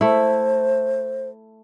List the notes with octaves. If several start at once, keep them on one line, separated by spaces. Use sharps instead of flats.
A3 E4 C5